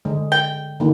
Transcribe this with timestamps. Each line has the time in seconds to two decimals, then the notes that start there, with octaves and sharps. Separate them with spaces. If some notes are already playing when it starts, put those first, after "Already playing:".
0.05 D3 G#3
0.32 G5
0.80 D3 D#3 A#3